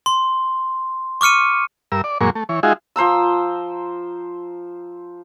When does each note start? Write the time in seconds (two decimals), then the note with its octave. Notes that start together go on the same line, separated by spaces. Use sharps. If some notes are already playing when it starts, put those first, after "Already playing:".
0.06 C6
1.21 C#6 D6 F6 C#7 D#7
1.92 G2 A#4 E6
2.04 D5
2.21 F#2 A#2 G#3 A#3 C#6
2.35 A3
2.49 E3 C#5
2.63 G#3 D#4 F4 F#4 G#4 E5
2.96 F3 C5 A#5 E6